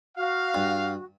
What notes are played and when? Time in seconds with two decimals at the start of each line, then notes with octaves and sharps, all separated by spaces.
0.17 F#4 F5
0.55 G2